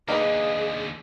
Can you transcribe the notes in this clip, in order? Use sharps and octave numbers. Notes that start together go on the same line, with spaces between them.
D#2 D3 A#3 D#4 G#4 B4 D#5